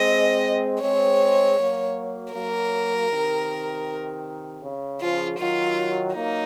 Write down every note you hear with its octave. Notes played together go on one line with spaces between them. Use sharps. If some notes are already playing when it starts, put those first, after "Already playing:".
Already playing: G#3 C4 D#5
G#3 C4 C#5
F#3 A#3
F#3 A#3 A#4
C3 D#3
C#3
C#3 F3 F4
D#3 F#3 F4
F#3 A#3 D#4